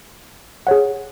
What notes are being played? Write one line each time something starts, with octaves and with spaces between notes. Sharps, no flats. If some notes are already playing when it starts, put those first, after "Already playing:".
G#4 C#5 F#5